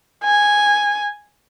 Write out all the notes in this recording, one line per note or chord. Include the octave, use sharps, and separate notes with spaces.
G#5